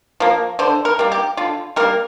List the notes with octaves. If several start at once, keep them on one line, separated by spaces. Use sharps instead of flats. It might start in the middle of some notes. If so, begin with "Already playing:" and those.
F3 A#3
D3 C5
A#4
G3 A#3
G4
D3 F4
G3 A#3 A#4